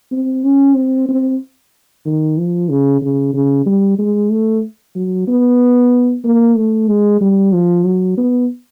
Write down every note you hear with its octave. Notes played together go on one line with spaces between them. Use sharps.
C4
C#4
C4
C4
D#3
F3
C#3
C#3
C#3
G3
G#3
A3
F#3
B3
A#3
A3
G#3
G3
F3
F#3
B3